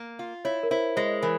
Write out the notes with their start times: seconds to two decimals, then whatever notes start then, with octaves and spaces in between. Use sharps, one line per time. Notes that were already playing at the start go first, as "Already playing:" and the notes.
Already playing: A#3
0.19 F4
0.45 E4 C#5
0.63 A#4
0.71 E4 C5
0.96 G#3 C5
1.22 E3 A#4